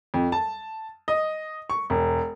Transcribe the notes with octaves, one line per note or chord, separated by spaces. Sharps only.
F2
A5
D#5
C#6
E1